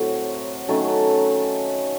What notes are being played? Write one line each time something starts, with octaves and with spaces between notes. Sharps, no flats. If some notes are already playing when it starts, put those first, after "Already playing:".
Already playing: A2 F#3 C4 F#4
D#3 F#3 A3 C#4 A4